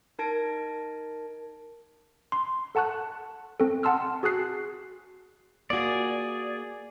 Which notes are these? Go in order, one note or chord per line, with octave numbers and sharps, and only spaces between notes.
D#4 A#4 A5 G#6 A#6 D7
C6
A4 F#5 A5 C#6 F#6
C4 A4
F#5 G5 A5 C6 E6 F6
F#4 G#4 G#5 F#6 C7
A#3 F4 F#4 G#4 D5